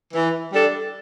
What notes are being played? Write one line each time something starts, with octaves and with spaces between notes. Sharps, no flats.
E3
G3 D4 A4